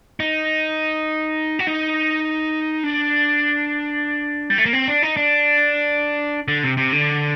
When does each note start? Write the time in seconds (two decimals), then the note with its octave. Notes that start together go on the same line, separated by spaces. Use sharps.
0.20 D#4
1.59 F#4
1.67 D#4
2.84 D4
4.50 G3
4.58 A3
4.66 A#3
4.73 C4
4.88 D4
5.03 D#4
5.17 D4
6.48 D3
6.63 C3
6.77 C3
6.93 D3